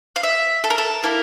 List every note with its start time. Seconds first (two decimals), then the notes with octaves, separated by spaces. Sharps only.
0.16 F5
0.23 E5
0.64 A4
0.70 A#4
0.78 A4
1.03 A#3 E4 A4 A#4